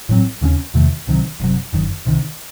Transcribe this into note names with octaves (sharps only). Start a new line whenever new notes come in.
A1 A2 F#3 C4
D#2 C#3 G#3 C#4
E2 C3 D#3 A3
C2 C3 D#3 F#3
F#1 E2 C3 F#3
F#1 F#2 D#3
C2 C3 D#3